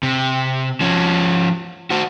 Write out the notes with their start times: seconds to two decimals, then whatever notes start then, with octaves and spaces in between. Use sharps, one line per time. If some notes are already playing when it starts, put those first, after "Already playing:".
0.03 C3
0.81 F3 C#4
1.90 F#4 C5